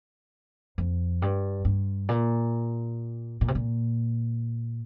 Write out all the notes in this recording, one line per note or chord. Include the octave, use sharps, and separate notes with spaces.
F2
G2
G2
A#2
A#2
C3
A#2